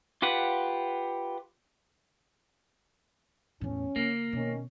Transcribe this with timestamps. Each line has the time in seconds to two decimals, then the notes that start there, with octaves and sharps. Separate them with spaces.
0.22 F4 G4 B4 F#5
3.61 E2 A2 C#4
3.96 C#3 A#3
4.33 B2 D#3 C#4